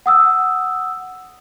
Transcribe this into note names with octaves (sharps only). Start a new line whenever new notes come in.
F#5 D#6 E6